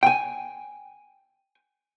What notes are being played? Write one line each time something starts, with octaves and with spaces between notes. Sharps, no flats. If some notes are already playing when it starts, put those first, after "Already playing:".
G5 G#5